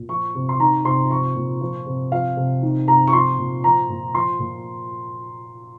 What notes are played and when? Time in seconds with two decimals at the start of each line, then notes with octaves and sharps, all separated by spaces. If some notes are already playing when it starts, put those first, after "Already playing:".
Already playing: A#2
0.09 F3 C#6
0.35 C3
0.49 C6
0.60 D#3 A#5
0.85 C3 C6
1.10 F3 C#6
1.36 A#2
1.61 F3
1.86 C3
2.12 F3 F5
2.37 C3
2.62 D#3
2.88 C3 A#5
3.07 C#6
3.13 F3 C6
3.38 A#2
3.64 F3 A#5
3.89 A#2
4.14 F3 C6
4.39 A#2